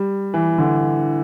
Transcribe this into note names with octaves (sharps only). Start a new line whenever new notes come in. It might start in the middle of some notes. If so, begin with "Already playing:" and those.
Already playing: G3
E3
D3